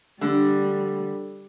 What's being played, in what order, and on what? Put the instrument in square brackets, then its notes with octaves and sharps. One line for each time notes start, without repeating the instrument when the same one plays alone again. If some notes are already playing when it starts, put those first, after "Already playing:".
[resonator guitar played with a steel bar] D3 [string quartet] G3